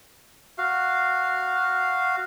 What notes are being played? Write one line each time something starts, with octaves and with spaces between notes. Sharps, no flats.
F#4 F5